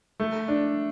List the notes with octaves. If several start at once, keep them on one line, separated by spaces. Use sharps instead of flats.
A3
D4